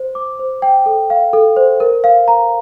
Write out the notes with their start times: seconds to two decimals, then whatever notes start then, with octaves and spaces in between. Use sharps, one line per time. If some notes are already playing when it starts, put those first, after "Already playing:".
Already playing: C5
0.15 D6
0.39 C5
0.62 G5
0.86 A4
1.10 F5
1.33 A4
1.56 C5
1.80 A#4
2.04 F5
2.28 A#5